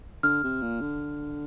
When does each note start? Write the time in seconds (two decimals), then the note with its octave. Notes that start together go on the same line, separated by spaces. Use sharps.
0.23 D3 F6
0.43 C3
0.62 A#2
0.81 D3